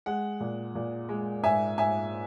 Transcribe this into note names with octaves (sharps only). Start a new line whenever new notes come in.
G#3 F#5
A#2
A#2
G#3
G#2 E5 G#5
G#2 E5 G#5